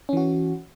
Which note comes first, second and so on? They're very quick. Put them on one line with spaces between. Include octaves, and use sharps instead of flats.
C#4 E3 F#4